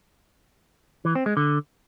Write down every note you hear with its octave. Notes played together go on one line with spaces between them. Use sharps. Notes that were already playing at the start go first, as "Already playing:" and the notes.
E3
C4
G#3
D3